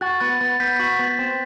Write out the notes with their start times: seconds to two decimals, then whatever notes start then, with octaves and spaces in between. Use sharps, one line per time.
0.01 F#4 F#6 A6
0.20 B3 F#6 A6
0.40 B3 F#6 A6
0.60 B3 G6 B6
0.79 F#4
0.99 B3
1.19 C4